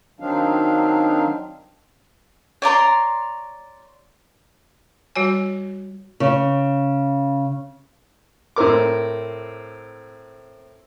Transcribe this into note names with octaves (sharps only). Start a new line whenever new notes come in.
D#3 F#3 C4 D4 D#4 F5
C#5 D5 A#5 C6
G3 F#4 C#5 G#5
C#3
A2 C4 A#4 D6